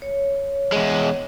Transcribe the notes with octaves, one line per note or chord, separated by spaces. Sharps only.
C#5
E2 G#3